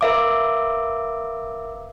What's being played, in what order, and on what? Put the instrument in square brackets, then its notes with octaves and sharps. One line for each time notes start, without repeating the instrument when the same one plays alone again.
[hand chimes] A#4 B4 E5 F5 D6